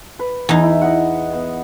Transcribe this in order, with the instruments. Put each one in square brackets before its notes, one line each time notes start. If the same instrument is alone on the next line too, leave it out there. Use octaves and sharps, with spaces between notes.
[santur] B4
[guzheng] E2 D#4
[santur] E4
D#5 F#5
B3